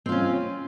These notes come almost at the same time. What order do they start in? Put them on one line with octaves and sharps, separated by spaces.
C4 F4 C#4